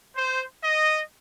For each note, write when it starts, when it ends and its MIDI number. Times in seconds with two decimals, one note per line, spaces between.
0.16 0.44 72
0.62 1.00 75